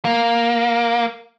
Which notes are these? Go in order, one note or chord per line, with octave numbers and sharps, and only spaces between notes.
A#3